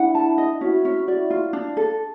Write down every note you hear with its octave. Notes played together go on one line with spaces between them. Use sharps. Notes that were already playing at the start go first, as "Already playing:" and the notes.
Already playing: D4 E4 F#5
A5
D#5
C#4 E4 F#4
C#4
E4 F#4 D5
F4
D4
A4